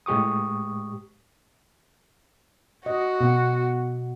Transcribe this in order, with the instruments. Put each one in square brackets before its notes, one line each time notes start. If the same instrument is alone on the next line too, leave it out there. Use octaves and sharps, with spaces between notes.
[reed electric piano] A2 G#3 G4 C#6 D#6
[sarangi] F#4 [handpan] D#5
[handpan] B2 F#5